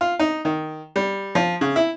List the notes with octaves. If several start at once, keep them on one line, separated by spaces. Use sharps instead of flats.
F4
D#4
D#3
G3
F3
C#3
E4